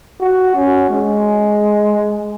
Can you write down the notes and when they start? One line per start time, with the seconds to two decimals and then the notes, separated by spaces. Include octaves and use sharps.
0.21 F#4
0.55 C#4
0.89 G#3